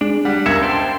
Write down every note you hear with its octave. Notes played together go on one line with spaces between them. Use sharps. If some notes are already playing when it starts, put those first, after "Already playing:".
G#3 D4
G3 F#5
C#2 A#4 E5 G#6 C#7
C5 G5 A5 C6